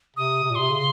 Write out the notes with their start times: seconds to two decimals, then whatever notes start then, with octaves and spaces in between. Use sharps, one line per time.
0.16 C3 D#6
0.43 C3
0.50 A#2
0.55 C3 C6
0.70 C#3